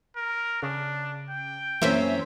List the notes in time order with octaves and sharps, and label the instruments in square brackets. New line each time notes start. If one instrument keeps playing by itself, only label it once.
[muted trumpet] A#4
[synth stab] C#3 [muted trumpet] D4
[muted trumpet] G5
[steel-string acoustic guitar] F#2 C4 C#4 [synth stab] E3 A#3 E5